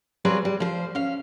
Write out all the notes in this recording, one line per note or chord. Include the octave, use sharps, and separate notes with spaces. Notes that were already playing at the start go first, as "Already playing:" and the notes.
F#3 G3 C4 F4 G#4 B4
G3
F3 C5
C#4 F5